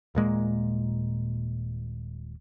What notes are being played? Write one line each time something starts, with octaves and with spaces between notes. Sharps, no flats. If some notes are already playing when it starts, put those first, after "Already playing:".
D#1 A#2 G#3 A#3